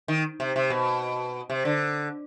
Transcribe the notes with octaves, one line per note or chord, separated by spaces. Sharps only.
D#3
C3
C3
B2
C3
D3